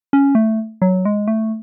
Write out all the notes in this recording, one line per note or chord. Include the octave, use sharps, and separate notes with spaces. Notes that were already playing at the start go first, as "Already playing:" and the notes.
C#4
A3
F#3
G#3
A3